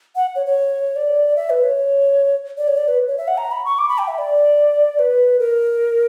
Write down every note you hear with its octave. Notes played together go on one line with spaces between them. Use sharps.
F#5
C#5
C#5
D5
E5
B4
C#5
D5
C#5
D5
B4
C#5
E5
F#5
A#5
B5
C#6
D6
B5
G5
E5
D5
B4
A#4